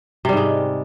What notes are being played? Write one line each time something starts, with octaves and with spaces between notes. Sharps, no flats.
G#2 C3 G3 G#3